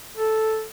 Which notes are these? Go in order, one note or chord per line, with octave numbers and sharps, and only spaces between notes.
A4